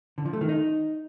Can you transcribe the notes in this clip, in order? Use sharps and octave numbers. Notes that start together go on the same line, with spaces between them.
D3
F3
A3
D#3
D#4